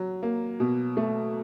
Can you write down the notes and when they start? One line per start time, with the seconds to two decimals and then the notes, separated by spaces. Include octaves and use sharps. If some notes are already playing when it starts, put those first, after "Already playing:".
Already playing: F#3
0.23 A#3
0.60 B2
0.97 A3